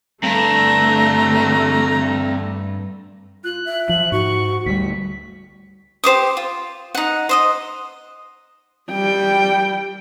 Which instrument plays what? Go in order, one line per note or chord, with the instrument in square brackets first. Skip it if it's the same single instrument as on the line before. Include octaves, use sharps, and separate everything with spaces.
[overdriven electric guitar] G2 [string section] D3 A3 [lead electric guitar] C4 A5 [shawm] A#5
[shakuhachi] F4 [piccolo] F#6
[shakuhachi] E5
[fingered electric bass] F3 [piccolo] F#7
[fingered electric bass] G#2 [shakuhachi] F#4 [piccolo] C#6
[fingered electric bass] D2 G3 [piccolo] B6
[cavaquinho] G4 C5 D6 D#6
F4
D#4 F#5
C5 D#5 D#6
[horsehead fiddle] G3 G5